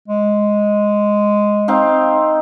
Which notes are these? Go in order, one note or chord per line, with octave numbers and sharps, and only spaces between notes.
G#3
C4 D#4 F5